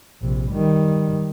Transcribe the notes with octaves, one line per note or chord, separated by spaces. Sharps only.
A#1 C3
D#3 G3